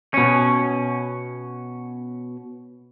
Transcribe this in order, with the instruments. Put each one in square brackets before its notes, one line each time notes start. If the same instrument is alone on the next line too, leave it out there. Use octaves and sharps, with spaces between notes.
[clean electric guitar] B2 C#4